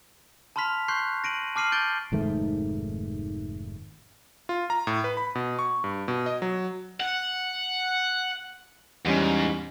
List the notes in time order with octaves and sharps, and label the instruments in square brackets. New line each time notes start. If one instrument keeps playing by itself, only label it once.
[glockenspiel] A5 B5 C6 F6 B6 F7
C6 C#6 F#6 G6 C7
A#6 D7 D#7 F#7
A5 D6 F6 C7 D#7 F#7
G6 A6 D7 G7
[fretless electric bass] F1 G#2 D#3 A3
[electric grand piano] F4
A#5
A2
B4
B5
B2
C#6
G2
B2
D#5
F#3
[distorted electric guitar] F#5
[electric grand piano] E2 G3 C#4 [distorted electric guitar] G#2